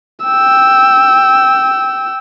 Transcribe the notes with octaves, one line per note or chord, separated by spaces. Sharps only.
G5 E6